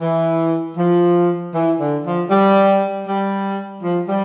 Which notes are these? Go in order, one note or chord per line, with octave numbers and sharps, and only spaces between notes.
E3
F3
E3
D3
F3
G3
G3
F3
G3